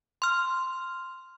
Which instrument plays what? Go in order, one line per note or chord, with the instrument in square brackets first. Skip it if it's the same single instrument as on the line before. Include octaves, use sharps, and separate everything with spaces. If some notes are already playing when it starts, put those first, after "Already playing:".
[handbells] C6 F6